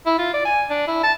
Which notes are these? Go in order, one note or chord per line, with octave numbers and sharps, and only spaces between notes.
E4
F4
D5
G#5
D4
E4
A5